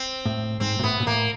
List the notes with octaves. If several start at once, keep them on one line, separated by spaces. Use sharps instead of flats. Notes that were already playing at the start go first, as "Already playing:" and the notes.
Already playing: C4
A2
G#2 C4
A#2
A2 B3
A#2
A2 A#3